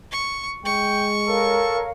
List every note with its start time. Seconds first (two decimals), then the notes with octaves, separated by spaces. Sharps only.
0.12 C#6
0.65 G#3 G5 C#6
1.28 A4 A#4 C#5 F5